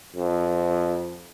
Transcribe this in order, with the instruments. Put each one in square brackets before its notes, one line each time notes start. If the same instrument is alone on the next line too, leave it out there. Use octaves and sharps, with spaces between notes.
[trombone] F2